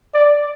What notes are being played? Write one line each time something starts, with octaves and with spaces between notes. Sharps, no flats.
D5